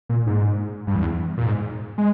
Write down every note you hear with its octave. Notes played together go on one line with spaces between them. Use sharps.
A#2
G#2
G2
E2
A#2
G#2
G#3